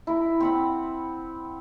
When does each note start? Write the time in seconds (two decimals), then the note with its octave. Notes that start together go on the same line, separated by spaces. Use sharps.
0.07 E4 A#4
0.40 C4 F#5 B5